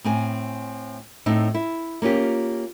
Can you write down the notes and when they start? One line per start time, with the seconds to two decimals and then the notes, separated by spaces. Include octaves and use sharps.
0.04 A2 C4 G#5
1.26 A2 C4 D#4
1.54 E4
2.02 A#3 C#4 F4 G4